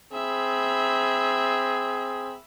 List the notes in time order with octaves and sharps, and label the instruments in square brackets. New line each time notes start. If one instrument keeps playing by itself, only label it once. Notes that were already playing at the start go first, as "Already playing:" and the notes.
[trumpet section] C4 G#4 [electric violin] E5 B5